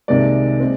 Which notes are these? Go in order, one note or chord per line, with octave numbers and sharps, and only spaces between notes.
C2 C3 D#3 G#3 D5
G#3 C4